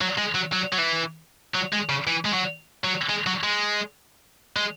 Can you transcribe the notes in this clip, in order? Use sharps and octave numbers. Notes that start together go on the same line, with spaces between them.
F#3
G#3
F#3
F#3
F#3
E3
F#3
G#3
C#3
E3
G#3
F#3
F#3
G#3
F#3
G#3
G#3